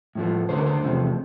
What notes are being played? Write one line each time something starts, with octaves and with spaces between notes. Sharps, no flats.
A2 F3 A3
D2 D3 A3 C5
A#4
C5
E2 C3 F3 A3